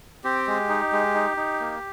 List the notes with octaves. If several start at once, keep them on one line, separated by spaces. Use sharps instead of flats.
C4 G4
G#3
D#4
G#3
D#4
D#4
A#3